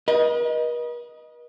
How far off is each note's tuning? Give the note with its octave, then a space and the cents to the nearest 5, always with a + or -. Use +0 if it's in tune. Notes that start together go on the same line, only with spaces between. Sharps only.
B4 -45 D#5 +0